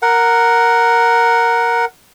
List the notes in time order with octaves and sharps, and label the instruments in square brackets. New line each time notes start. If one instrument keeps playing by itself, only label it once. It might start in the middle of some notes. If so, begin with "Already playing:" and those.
[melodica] A#4 F#5